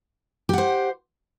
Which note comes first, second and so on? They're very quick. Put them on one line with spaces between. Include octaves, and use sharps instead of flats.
G4 F#5 C5